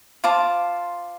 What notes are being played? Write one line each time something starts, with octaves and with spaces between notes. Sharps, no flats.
F4 C5 A5 D6